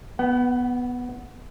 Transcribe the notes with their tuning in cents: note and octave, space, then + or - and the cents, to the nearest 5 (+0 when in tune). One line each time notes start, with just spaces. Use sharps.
B3 -5 F#5 +35